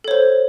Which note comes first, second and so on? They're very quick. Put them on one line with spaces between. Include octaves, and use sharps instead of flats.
A4 C#5 C5